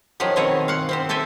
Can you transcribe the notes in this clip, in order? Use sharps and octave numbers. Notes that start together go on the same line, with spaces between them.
D#3 F3 F#3 G4 G#4
B2 D#3 C4 G#4 C#5
F5 F#5
C4 G4 C5
G4 A4 E5 G5 G#5